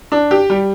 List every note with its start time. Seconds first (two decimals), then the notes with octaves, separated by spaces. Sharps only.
0.12 D4
0.31 G4
0.50 G3